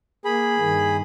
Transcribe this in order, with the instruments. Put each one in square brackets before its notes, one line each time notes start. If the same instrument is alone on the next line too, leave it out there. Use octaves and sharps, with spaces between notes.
[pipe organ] A#3 [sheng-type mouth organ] G#4 B5
[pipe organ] G2 D#3